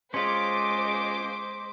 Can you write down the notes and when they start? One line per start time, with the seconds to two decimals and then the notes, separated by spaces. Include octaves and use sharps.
0.14 G#3 C#4 F4 C5 C6 D6 B6